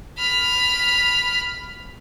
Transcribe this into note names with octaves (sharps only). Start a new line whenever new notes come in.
B5 F6